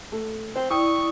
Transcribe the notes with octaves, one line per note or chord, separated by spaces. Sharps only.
A3
C4 C5
E4 D5 G5 C#6 D#6